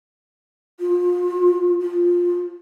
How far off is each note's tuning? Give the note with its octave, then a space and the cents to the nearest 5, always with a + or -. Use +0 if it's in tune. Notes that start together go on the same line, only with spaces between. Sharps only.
F4 +30
F4 +5